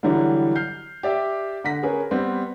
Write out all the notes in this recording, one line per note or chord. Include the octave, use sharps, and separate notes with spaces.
D3 E3 F#3 G3 E4
F6 G6 C7
G4 D5 E5 G5
D3 F#5 A#6 B6
C#4 G#4 A#4 B4
G3 B3 C4